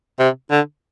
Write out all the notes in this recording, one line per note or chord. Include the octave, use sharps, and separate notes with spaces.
C3
D3